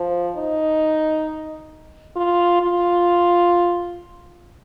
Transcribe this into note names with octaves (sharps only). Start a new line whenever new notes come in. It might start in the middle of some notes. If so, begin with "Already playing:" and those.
Already playing: F3
D#4
F4
F4